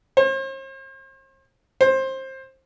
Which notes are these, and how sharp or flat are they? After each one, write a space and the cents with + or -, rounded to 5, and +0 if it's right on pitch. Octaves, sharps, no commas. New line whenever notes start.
C5 +45
C5 +20